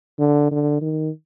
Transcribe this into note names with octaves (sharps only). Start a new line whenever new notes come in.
D3
D3
D#3